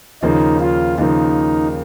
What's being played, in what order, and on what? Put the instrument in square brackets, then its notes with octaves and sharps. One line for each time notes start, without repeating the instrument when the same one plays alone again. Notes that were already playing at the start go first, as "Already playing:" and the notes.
[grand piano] D#2 C#3 F3 A#3 [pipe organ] D#4
[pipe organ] F4
[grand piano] D#2 C#3 F3 A#3 [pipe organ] D#4